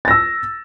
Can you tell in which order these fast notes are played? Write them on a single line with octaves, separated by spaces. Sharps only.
A6 A#6 E6